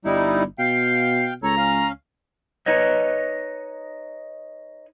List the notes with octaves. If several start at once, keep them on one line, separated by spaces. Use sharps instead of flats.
G1 G3 D#4 E4
B2 F5 G5 C7
C#2 A4 C#5 A#5
C#4 F5
D#4 B4 C#5 D#5